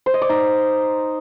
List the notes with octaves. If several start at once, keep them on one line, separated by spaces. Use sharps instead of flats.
C5
D#5
D5
D#4